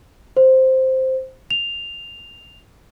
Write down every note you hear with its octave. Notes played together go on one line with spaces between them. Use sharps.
C5
F7